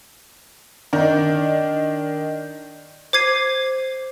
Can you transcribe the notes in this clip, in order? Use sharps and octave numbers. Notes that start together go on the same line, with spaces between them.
D#3 D4
C5 D6 G#6 C7 D#7